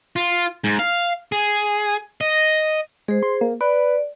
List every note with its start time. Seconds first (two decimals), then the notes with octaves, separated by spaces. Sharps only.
0.16 F4
0.64 G#2
0.79 F5
1.32 G#4
2.21 D#5
3.08 G#3 G#4 C5
3.23 C6
3.41 A#3
3.61 B4 D5